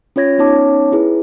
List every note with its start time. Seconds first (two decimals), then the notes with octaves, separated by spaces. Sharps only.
0.16 C#4 F4 C#5 G#6 A#6
0.38 B3 C#4 D#4 C#5 A5 D6
0.92 E4 G#4 B4